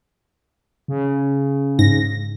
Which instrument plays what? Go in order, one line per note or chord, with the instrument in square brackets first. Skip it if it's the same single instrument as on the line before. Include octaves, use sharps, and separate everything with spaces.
[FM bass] C#3
[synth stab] G#2 A#6